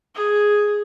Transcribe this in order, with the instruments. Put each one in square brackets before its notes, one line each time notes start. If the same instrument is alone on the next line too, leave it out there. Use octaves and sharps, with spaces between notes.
[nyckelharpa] G#4